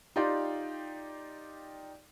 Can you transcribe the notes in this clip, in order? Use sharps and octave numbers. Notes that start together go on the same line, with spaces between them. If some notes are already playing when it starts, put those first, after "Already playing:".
D#4 F4 G4 D5 G5 C6